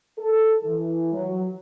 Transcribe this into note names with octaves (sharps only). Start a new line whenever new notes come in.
A4
E3
F#3